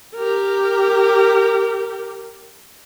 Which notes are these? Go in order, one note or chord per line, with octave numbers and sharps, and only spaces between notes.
G4 A#4